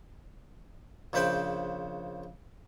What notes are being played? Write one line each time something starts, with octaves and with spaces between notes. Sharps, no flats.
A#1 C#3 B4 C5 G5 C6